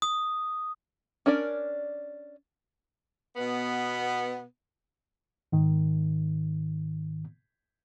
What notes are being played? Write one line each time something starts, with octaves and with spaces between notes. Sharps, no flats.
D#6
C#4 D4 A#4 D5
B2 B3
G#2 D#3